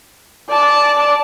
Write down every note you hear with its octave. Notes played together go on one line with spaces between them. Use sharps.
D5 A5